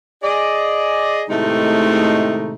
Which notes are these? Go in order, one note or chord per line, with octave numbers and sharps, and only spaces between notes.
G#4 D5 D#5
A2 C3 D#3 G#3 A3 D#4